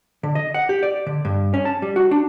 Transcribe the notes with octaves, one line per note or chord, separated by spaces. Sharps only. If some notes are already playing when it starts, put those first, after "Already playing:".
D3
D#5
F#5
G4
D5
D3
G2
C#4
A5
G3
F#4
D4